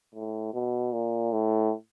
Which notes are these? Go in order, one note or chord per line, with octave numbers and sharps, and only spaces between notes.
A2
B2
A#2
A2